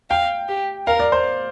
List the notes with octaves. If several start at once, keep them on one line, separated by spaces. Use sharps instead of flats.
F5 G5
G4
A#4 F5
D5
C5